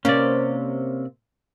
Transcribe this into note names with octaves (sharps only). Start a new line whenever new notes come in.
C3 A#3 C#4 D5